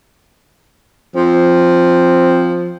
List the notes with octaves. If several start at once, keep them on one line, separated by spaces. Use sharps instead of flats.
F3 C4